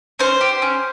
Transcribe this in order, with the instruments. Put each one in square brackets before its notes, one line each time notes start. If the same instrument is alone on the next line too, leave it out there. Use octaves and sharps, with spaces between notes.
[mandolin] C#4 C5
G4
C#4